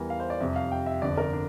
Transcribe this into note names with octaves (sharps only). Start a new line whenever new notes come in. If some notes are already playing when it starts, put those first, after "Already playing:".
Already playing: E2 E3 G3 A#4
F5
C5
D5
F2 C3 G3 E5
F5
G5
E5
G1 F2 D3 D5
A#4
D4